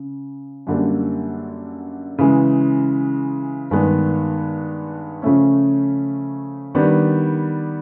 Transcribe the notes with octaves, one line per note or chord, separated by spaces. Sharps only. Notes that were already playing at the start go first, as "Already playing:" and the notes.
Already playing: C#3
F#2 D3 G3 A#3 D4
C#3 E3 G#3
G2 D#3 G#3 B3 D4
C#3 F3 A3 C#4
D#3 G3 B3 D4